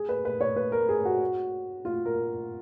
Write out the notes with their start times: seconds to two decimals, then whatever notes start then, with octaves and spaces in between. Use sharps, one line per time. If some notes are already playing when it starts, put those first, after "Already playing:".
Already playing: G#4
0.09 B4
0.25 B4
0.41 C#5
0.56 B4
0.72 A#4
0.89 G#4
1.05 F#4
1.85 F4
2.05 A#4